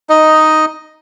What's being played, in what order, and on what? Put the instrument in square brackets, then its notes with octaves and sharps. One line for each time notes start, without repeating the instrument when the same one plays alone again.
[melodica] D#4 D#5